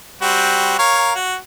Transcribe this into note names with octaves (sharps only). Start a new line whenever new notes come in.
G3 C4 F#4
A#4 C#5 F5
F#4